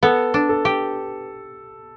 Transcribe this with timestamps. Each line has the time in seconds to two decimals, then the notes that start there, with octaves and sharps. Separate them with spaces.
0.03 B3 A4
0.34 D4
0.49 A4
0.65 G4